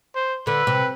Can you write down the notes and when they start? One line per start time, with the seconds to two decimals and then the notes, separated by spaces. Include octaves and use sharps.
0.15 C5
0.47 D3 B4
0.67 C3